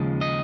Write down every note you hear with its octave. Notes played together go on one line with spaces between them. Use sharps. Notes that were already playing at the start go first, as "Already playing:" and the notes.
Already playing: D#2 C#3 F3 G#3
D#5